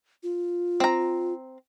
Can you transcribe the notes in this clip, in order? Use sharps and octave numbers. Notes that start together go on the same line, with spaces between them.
F4
C4 A#5